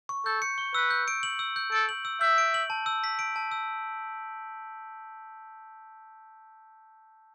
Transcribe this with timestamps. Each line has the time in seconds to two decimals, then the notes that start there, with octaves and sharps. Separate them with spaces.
0.09 C#6
0.25 A4 G6
0.42 C#7
0.58 C#6
0.75 B4 E6
0.90 G6
1.08 D7
1.23 F#7
1.39 E6
1.56 G6
1.72 A4 D7
1.89 F#7
2.05 E6
2.21 E5 G6
2.38 D7
2.54 F#7
2.70 A5
2.86 E6
3.04 B6
3.19 D7
3.36 A5
3.51 E6